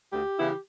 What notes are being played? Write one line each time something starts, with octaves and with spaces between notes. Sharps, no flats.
D2 G4
C#3 E3 B3 E4